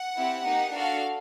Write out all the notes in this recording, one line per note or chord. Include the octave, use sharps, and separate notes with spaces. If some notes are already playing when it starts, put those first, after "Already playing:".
Already playing: F#5
C4 E4 G4
A#3 D#4 G4
D4 F#4 A4 F5